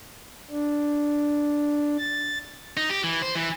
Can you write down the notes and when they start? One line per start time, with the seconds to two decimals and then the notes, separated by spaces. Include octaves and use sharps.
0.51 D4
1.98 A6
2.77 D#4
2.90 G4
3.04 E3
3.22 C5
3.35 E3